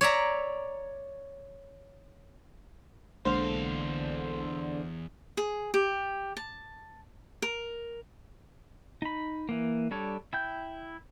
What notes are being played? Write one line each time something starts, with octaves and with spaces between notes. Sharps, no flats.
C#5 D5 E5 A#5
B1 E2 D3 G#3 A#3 C5 F5
G#4
G4
A5
A#4
D#4 B5
E3 A#3
G3 D4 A4 C#5
E4 G5 G6